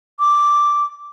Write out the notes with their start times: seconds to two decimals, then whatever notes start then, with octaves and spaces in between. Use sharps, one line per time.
0.19 D6